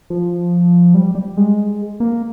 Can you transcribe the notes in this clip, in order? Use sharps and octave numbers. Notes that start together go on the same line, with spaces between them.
F3
G3
G3
G#3
A#3